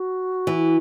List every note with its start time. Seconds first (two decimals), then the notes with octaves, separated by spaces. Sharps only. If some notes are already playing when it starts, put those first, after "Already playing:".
Already playing: F#4
0.47 E3